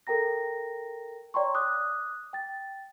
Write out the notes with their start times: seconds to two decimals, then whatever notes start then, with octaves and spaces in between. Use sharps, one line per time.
0.07 A4 A#4 G5 A#5 A#6
1.34 C#5 D5 G5 A#5 C6 C#6
1.54 D6 D#6 F#6
2.33 G5 A6